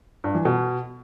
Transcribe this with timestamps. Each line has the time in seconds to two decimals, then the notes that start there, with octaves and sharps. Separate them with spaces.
0.24 G2
0.35 E3
0.45 B2